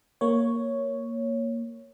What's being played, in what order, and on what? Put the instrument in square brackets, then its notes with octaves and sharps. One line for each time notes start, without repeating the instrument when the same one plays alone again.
[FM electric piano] A#3 C#5